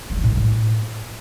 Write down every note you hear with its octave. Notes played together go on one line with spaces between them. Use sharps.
F#3
F3
A2
F#3
A2